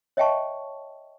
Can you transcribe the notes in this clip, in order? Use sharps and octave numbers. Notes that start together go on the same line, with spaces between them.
C#5 D#5 E5 G5 A5 C#6